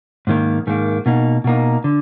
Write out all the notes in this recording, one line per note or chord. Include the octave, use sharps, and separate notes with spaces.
G#2 D#3 A#3
G#2 D#3 A#3
B2 A#3 D#4
B2 A#3 D#4
D3